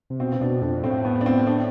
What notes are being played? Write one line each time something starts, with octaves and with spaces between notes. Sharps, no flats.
C3
B2 C4
C4
B2 D4
F2 D4
A2 C4
B3
D4
C4
D4